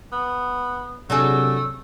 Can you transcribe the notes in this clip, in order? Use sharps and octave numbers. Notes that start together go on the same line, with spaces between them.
B3
C3 F#3 A3 D4 G#4 E6